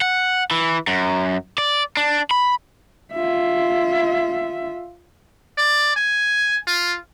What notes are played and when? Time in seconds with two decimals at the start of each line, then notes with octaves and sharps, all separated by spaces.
0.02 F#5
0.51 E3
0.87 F#2
1.58 D5
1.97 D4
2.31 B5
3.13 F4 E5
5.58 D5
5.96 G#5
6.67 F4